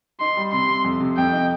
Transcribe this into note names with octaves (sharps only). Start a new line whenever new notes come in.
D#4 C6
G3
C3 C6
C3
F2
C3
F2 G5
D#4